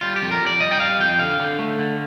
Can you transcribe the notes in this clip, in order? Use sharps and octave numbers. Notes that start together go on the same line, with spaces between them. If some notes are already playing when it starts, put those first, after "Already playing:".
G3 F4
G4
F2
A#4
F2
D5
G3 D#5
G5
G3 F5
F2 G5
D3 F5
D3
A3
D3